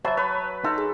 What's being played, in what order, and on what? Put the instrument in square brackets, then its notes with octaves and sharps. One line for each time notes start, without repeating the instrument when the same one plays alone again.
[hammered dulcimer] F#3 [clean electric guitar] C5 E5 [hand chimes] A5 B5 A6
[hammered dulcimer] B4 [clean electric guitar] C#5
[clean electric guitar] D#4 [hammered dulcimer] A4 [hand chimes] C6
[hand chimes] G#4